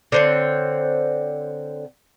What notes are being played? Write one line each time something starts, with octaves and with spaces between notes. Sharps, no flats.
D3 C4 C#5